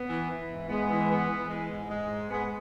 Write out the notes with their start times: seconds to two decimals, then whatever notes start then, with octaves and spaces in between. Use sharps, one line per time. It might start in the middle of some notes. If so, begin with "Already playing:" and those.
Already playing: B3
0.09 E3
0.30 E3
0.49 G#2
0.69 G#3 B3
0.90 E3
1.10 B3
1.30 E3
1.49 G#3
1.69 G#2
1.89 G#3
2.09 G#2
2.29 G#3 B3